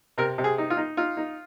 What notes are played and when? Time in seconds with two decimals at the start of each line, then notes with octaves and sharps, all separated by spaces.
0.18 C3 A#4
0.38 C3
0.44 G#4
0.58 D#4
0.70 F4
0.77 D#4
0.97 D#4 F4
1.17 D#4